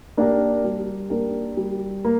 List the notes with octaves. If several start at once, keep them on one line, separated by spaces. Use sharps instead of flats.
A#3 D4 G4 A#4
G3
A#3 D4 G4 A#4
G3
A#3